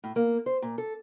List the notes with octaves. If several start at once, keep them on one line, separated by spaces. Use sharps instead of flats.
A2
A#3
C5
A#2
A4